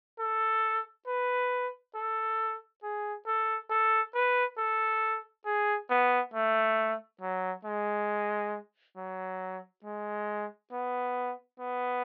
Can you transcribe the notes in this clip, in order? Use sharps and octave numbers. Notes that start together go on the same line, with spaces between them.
A4
B4
A4
G#4
A4
A4
B4
A4
G#4
B3
A3
F#3
G#3
F#3
G#3
B3
B3